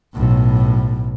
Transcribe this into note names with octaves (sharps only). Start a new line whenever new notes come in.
B1 A2